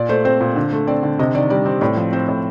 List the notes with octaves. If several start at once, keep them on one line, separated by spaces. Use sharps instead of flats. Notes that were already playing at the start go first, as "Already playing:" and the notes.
Already playing: A#2 D5
A3 C5
C4 C5
A#2
D3
A3
C4 D5
D3
C3 D#5
D#3 D5
G3 D5
C4
A2 D5
F3
C4 C5
A2